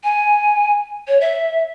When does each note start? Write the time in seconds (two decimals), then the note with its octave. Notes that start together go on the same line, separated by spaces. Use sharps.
0.04 G#5
1.08 C#5
1.21 E5